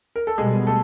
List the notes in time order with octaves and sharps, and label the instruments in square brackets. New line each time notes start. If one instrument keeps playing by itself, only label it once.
[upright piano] A#4
A4
[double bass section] B2 G3 B3 [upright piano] G#3 G#4
[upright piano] A3 A4